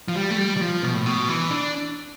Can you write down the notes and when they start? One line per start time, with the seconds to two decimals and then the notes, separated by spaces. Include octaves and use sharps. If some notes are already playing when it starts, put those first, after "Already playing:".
0.08 F3
0.16 G3
0.31 A3
0.38 G3
0.57 G3
0.61 F3
0.83 B2
0.94 A2
1.06 B2
1.29 E3
1.51 D4